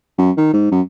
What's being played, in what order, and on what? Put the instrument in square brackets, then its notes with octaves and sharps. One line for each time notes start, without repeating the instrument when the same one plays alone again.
[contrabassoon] F#2
D#3
G#2
F#2